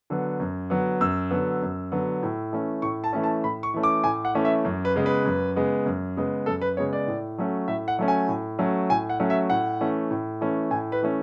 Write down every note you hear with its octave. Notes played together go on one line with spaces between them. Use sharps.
D3 F#3 B3
F#2
D3 F#3 B3
F#2 E6
D3 F#3 B3
F#2
D3 F#3 B3
A2
E3 A3 C#4
A2 C#6
A5
E3 A3 C#4
A5
A2 B5
C#6
E3 A3 C#4
D6
A2 G#5
F#5
E3 A3 C#4
E5
F#2
B4
C#3 G#3 B3
B4
F#2
C#3 G#3 B3
F#2
C#3 G#3 B3
F#2 A4
B4
C#3 G#3 B3 C#5
D5
A2
F#3 A3 C#4
A2 E5
F#5
F#3 A3 C#4
G#5
A2
F#3 A3 C#4
A2 G#5
F#5
F#3 A3 C#4
E5
A2 F#5
E3 A3 C#4
A2
E3 A3 C#4
A2 G#5
B4
E3 A3 C#4